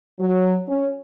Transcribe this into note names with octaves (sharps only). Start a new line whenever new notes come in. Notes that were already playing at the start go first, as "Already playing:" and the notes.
F#3
C#4